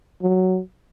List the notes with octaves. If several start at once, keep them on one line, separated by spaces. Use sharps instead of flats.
F#3